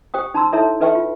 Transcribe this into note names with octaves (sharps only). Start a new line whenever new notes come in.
G4 C5 G5 D#6
D#4 A5 A#5 C6 E6
D#4 E4 A4 C#5 E5 A#5
D#4 A4 B4 E5 G5 C#6
F4